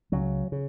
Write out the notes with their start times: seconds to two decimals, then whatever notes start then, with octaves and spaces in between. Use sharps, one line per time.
0.12 C#2 C#3 F#3
0.52 C#3